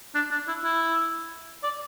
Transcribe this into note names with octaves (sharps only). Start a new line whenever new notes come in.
D4
D4
E4
E4
D5